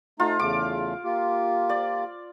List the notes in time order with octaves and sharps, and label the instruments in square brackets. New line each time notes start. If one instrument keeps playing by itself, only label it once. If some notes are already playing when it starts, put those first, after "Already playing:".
[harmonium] A3 D#4 A#5 [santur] F4
[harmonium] E2 C#3 A3 [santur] D6
[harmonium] A#3 F4 G4
[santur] D5